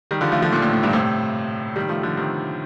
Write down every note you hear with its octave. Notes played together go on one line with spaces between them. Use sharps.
D#3 G3
D3 F3
F3 A3
D3 F3
A#2 D3
A2
A2
G2 A#2
A2 C3
D#3 G3
F3 A3
D3 F3
C3 D#3